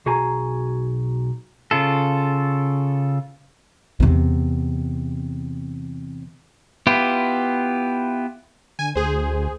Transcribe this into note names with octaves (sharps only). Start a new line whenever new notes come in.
B1 F#4 G#4 G#5 A#5
C#3 F4 A4
E2 C3
B3 E4 F4 G4
D3 G#5
D2 G#4 C5